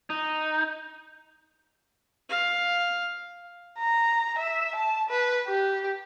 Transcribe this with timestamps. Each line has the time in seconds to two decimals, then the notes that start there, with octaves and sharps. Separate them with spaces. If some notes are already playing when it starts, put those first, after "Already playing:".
0.10 D#4
2.29 F5
3.79 A#5
4.38 E5
4.75 A5
5.09 B4
5.47 G4